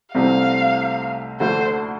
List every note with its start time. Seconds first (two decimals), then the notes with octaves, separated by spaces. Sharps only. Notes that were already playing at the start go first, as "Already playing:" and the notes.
0.14 C2 C3 A3 C4 F5
1.40 D2 D3 A3 C5